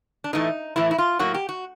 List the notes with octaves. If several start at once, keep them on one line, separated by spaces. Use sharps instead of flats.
D4
A2 E3 A3 D#4
A2 E3 A3 E4
E4
F4
A2 F#3 A#3 F#4
G4
F#4